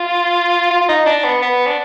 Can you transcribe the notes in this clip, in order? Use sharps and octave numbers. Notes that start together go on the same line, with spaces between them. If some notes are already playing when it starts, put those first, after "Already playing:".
Already playing: F4
F4
F4
D#4
D4
B3
B3
D4